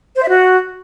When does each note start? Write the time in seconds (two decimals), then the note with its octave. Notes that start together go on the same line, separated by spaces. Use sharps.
0.16 C5
0.23 E5
0.29 F#4